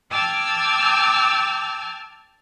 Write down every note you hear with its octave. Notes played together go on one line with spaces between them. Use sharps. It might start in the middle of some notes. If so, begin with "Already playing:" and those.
G5 A5 D6 E6 F6 G#6